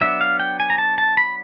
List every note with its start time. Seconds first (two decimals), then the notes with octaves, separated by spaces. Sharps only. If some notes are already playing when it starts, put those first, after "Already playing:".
0.01 F#3 B3 D4 E5
0.21 F5
0.40 G5
0.60 G#5
0.70 A#5
0.78 A5
0.98 A5
1.17 B5